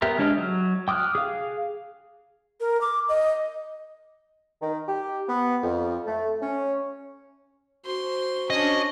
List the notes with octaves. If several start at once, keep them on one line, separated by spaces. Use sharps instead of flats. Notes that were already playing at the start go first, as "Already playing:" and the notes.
B3 G4 A#4 E5
G#3 D4 C#5 D#5 F6
F#3
G5 D6 D#6 F6 F#6
G#4 F5
A#4
D6
D#5
D#3
G4
B3
F2
A3
C#4
F#4 C5 C6
C#4 D4 D#5